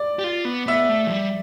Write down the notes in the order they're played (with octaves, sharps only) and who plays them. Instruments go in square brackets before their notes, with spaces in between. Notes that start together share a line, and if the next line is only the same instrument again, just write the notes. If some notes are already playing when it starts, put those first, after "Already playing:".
Already playing: [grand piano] D5
[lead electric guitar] G4
F4
B3
[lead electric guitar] B3 [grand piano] E5
[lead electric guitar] A3
F3
G3